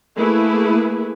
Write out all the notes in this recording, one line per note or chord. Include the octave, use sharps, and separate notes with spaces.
A3 A#3 E4 G#4 B4